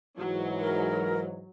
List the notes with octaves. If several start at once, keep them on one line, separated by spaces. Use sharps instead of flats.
G#2 E3 F#3
A#4